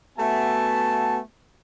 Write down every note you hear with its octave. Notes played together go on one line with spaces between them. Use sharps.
A3 B3 F#4 E5 G#5 A5